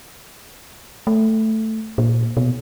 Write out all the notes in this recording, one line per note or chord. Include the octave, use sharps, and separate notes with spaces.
A3
A#2
B2